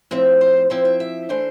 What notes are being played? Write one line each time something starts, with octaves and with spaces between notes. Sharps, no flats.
A2 F3 C4 E5
C5
F3 C4 E4 C5
E5
E5
E3 A3 D4 C5